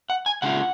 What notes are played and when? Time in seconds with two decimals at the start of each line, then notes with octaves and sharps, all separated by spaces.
0.10 F#5
0.26 G#5
0.42 C#3 G#3 C#4 F4 F#5